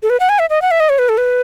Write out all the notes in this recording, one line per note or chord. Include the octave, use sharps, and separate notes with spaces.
A4
B4
F#5
G#5
E5
D#5
F#5
E5
D#5
C#5
B4
A4
B4